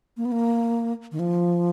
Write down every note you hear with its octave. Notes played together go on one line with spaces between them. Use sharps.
A#3
B3
A#3
D#3
F3